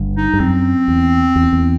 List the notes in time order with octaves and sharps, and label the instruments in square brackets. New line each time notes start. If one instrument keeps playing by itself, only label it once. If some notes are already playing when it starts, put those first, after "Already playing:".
Already playing: [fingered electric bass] G1 G2
[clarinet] D#4
[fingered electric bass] G2
[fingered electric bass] F#2 [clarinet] C4
[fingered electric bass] E2
E2
E2